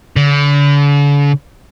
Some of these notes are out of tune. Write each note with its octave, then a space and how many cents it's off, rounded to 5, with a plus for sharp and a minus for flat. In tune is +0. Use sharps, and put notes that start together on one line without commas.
D3 -40